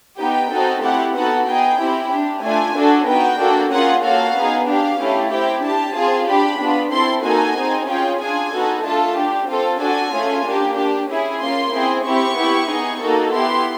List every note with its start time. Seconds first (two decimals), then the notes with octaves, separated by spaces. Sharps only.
0.18 B3 D#4 G4 G5
0.51 C4 D#4 F#4 A4
0.83 A3 C4 E4 G4 F#5
1.15 B3 D#4 F#4 A4 F#5
1.47 B3 D#4 G#4 G5
1.79 C4 E4 G4
2.11 D4 G4
2.43 A3 D4 F4 G#5
2.75 D4 F#4 A4
3.07 B3 D#4 F#4 G5
3.39 A#3 D4 F#4 A4
3.71 A#3 C#4 F4 G#4 F#5
4.03 A#3 C#4 F#4 A4 F5
4.35 B3 D#4 G#4
4.67 D4 G4 F5
4.99 A3 C#4 E4 G4
5.31 C4 E4 G4 G5
5.63 D4 G4 A5
5.95 C4 F4 G#4
6.28 D4 G4 B5
6.60 B3 D4 F4
6.92 C4 E4 A4 C6
7.24 A#3 D#4 F#4 A4 G#5
7.56 C4 D#4 G#4
7.88 C#4 F4 G#4 G5
8.20 D4 F4 G#4 G#5
8.52 B3 D#4 F#4 A4
8.84 A3 D4 F4 A4 A5
9.16 D4 G4
9.48 C4 F4 A4
9.80 D4 F#4 A4 G#5
10.12 A3 C#4 F4 G#4
10.45 A#3 D4 G4
10.76 D4 G4
11.08 C#4 E4 G#4
11.41 A#3 C#4 F4 C6
11.72 C4 E4 G#4
12.05 C4 E4 G4 C#6
12.36 B3 E4 G4
12.69 B3 D#4 G#4
13.00 A#3 D#4 F#4 A4
13.32 B3 E4 G4 C6